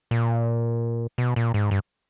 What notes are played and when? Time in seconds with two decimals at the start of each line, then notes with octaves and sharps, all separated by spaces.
0.11 A#2
1.18 B2
1.36 A#2
1.54 G#2
1.71 G2